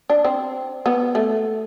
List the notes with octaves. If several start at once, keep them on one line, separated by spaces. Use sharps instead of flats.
D4
C4
B3
A3